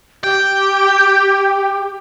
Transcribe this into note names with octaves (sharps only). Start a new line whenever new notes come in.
G4 G5